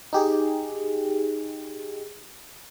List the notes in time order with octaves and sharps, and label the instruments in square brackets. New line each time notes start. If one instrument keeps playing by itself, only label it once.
[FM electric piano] D#4 G4 G#4